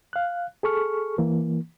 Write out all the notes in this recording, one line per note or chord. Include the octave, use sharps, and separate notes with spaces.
F5 F#6
G#4 A4 C#6 F6
E3 A#3